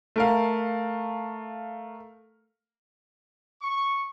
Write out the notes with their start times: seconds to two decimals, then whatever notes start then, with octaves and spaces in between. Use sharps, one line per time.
0.16 A3 A#4 F5
3.62 C#6